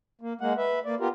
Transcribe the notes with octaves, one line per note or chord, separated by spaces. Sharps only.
A#3
G#3 A#3 F#5
B4 E5
A#3 D5
B3 F4 G4 A#4